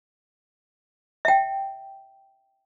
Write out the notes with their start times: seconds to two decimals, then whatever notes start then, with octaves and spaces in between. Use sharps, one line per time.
1.25 E5 G5